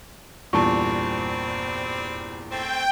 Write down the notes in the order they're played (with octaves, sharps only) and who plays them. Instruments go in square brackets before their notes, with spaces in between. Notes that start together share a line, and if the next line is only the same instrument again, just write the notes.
[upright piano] E2 G2 A#2 [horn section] G3 C4 [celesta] A5 C#6
[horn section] A3 C4 [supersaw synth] G5